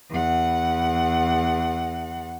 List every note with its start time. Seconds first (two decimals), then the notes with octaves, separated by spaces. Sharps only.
0.10 E2 F#5